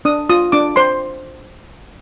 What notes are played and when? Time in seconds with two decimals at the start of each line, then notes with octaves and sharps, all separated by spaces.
0.05 D4 D#6
0.29 F4 D#6
0.52 D4 D6
0.76 C5 C6